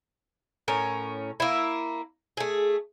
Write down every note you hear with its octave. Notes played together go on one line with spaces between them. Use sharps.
A2 C#4 A#4
A#3 E4
A3 G#4